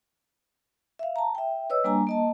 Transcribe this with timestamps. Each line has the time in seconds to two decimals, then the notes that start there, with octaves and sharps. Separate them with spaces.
0.99 E5 F5
1.16 A5 A#5
1.35 E5 G5
1.70 B4 C#5 D#5 E6
1.84 G3 A#3 D4 G#5 A#5
2.07 A#3 D#5 A5